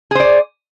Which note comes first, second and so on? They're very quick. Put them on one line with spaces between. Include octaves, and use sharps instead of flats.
G#4 C5 D5